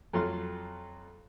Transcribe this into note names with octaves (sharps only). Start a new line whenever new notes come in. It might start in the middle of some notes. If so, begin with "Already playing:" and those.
F2 F#3 A3 F4 C6